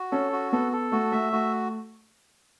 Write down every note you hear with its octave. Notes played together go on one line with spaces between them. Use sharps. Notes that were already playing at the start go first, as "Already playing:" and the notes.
Already playing: F#4
C#4 A4
F#4
B3 A4
A4
A3 F#4
A3 E5
A3 F#4